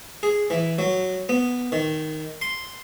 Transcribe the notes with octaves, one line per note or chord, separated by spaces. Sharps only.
G#4
E3
F#3
B3
D#3
C6